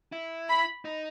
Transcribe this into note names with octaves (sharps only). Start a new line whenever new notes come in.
E4
B5
D#4